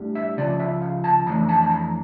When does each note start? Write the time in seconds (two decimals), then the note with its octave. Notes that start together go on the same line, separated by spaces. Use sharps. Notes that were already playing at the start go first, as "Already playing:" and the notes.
Already playing: A2 G3 D4
0.15 E5
0.37 C#2 C#3 F3 D5
0.60 E5
0.82 F5
1.04 A5
1.26 F2 E3 A3 D4 A#5
1.49 A5
1.63 A5
1.70 A#5